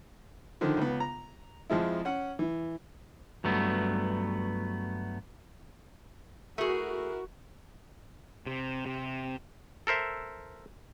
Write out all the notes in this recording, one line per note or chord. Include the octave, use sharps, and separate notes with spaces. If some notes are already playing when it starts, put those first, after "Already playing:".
D3 D#3 F3
C#2 B3
A#5
F2 F3 G#3 E4
C#4 F#5
E3
G2 F#3 A3 B3
A3 E4 F#4 G#4 A#4
C3
C3
A4 A#4 C5 E5